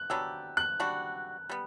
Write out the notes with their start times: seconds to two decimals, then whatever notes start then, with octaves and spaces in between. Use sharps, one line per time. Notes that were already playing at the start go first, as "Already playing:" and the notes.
Already playing: F#6
0.10 F#3 B3 D4 G4 E6
0.57 F#6
0.80 G3 D4 F#4
1.49 G3 B3